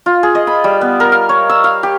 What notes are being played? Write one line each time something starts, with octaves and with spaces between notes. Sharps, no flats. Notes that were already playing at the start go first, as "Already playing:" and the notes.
F4
G#4
D#5
B5
G3
B3
A#4
F5
C#5
E6
F5
G4